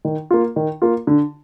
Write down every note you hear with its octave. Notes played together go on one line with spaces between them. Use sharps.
D#3
A#3 F4
D#3
A#3 F4
D3